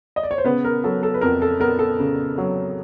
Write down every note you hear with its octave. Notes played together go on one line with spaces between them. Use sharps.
D#5
D5
C#5
C5
C#3 B3 B4
A#4
F#3 A4
A4
B4
F2 A#4
A4
B3 A#4
A4
C#3
F#3